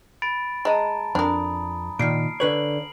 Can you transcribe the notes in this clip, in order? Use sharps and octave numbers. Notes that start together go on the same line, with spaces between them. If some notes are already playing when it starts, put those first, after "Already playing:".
B5 A6 D7
G#3 D#5 A5 A#5
F2 D4 A#4 B5 D#6
A#2 D#3 F6 C7 D7
D3 B4 C#5 F#7